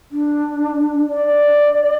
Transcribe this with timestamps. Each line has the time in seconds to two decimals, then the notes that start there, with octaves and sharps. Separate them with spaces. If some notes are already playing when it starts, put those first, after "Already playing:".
0.11 D4
1.09 D5